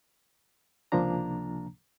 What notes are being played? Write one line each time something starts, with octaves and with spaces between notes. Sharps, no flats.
C#2 C3 F3 A#3 D4 A#5